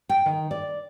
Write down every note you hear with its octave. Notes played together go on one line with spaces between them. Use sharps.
G5
D#3
D5